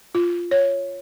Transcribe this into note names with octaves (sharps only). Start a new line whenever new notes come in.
F4
C#5